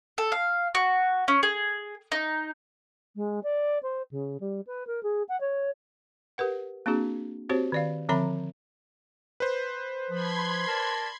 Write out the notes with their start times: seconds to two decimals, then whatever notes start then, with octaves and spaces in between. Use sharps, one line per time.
0.18 A4
0.32 F5
0.75 F#4
1.28 C#4
1.43 G#4
2.12 D#4
3.16 G#3
3.43 D5
3.83 C5
4.11 C#3
4.40 G3
4.67 B4
4.87 A#4
5.03 G#4
5.29 F#5
5.41 C#5
6.38 G4 A#4 B4 F#5
6.86 A#3 C4 D4 F#4 G#4
7.49 C4 F#4 G4 C5 C#5
7.72 D#3 D5 F5
8.09 D3 F3 C4 E5 A#5 B5
9.40 B4 C5
10.10 F3 B5 C6 G#6
10.67 A#4 D5 A5